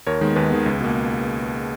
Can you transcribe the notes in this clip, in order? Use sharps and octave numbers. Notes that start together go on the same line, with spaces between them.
D#2 A#4 C#5
D#3 G#3 B3
D#2 G#4 B4
D#3 G#3 B3
C#2
B2 A#3